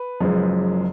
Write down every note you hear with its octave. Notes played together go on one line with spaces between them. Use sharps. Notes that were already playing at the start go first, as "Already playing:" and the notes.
Already playing: B4
F#1 F#2 F3 G#3